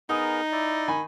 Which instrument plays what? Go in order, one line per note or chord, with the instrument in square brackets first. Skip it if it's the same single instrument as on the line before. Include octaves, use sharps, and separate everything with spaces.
[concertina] B3 G#4 A#4 [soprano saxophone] D#4 [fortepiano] D#6
[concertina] E4 D5
[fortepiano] D#3 G#5 B5